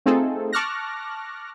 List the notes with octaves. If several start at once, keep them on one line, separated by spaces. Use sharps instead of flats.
A3 C4 D#4 F4 G#4 A4
A5 C#6 D6 F6 F#6 A#6